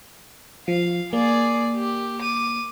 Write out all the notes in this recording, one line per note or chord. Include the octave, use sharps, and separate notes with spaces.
F3 F5
A#3 G#4 D5
G4
D6 D#7